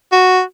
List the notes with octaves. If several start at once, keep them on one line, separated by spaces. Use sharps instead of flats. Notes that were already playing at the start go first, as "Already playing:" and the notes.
F#4